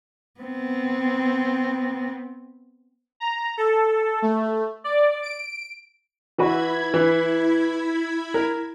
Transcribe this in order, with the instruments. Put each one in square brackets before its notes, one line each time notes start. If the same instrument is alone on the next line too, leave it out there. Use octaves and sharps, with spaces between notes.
[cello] B3 C4
[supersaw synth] A#5
A4
A3
D5
D7
[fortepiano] E3 F#4 B4 [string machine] E4 B5 G#6
[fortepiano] E3
A#4